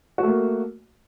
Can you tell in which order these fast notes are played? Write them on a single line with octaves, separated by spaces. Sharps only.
F#4 A3 A#3